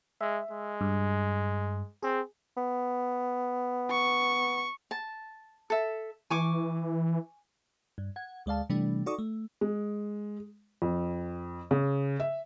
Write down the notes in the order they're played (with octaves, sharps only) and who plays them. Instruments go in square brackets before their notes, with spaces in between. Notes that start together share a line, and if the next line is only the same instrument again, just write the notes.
[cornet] G#3 [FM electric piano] E5
[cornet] G#3
[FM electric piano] G2
[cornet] C4 [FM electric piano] G#4
[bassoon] B3
[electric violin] C#6
[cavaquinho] A5
A4 E5
[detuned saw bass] E3 [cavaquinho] G#5 C#6 D6
[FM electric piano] G2
F#5 G#6
D2 G#3 D5 F5 A5
C3 E3 G3 A3 D4
D#4 F#4 A4 D5 C#6 D#6
A3
[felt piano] G#3
F2
C#3
E5